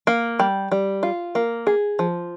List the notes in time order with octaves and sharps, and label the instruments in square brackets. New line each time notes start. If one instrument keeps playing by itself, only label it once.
[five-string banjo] A#3
G3
G3
F4
A#3
G#4
F3